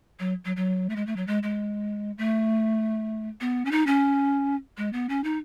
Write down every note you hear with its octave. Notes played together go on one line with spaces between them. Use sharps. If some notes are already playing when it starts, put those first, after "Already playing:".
F#3
F#3
F#3
A3
G#3
A3
F#3
G#3
G#3
A3
B3
C#4
D#4
C#4
G#3
B3
C#4
D#4